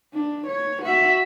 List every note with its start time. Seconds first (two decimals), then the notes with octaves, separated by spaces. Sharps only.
0.14 D4
0.47 C#5
0.82 F#4 E5